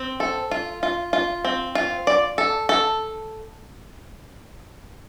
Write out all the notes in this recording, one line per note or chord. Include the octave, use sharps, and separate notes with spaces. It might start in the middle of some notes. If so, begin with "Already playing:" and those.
Already playing: C4
A4
F4
F4
F4
C4
F4
D5
A4
A4